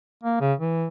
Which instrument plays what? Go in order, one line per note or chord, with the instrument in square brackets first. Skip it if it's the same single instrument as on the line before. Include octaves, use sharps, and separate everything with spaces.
[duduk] A#3
C#3
E3